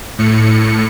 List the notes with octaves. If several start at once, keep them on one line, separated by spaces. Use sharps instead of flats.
A2 C#7